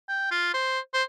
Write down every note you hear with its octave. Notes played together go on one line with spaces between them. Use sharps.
G5
F4
C5
C5